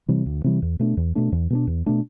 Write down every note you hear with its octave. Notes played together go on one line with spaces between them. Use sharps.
C3 E3 G3
D2
C3 E3 G3
E2
B2 A3 D4
E2
B2 A3 D4
E2
B2 A3 D4
E2
B2 A3 D4